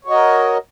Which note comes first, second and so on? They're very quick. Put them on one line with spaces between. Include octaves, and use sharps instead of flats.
C#5 F#4 D#5 A#4